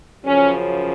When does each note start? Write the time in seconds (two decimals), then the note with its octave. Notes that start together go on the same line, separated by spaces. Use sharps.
0.25 F#2 C#3 F3 C#4